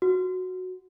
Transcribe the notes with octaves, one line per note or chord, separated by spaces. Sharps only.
F#4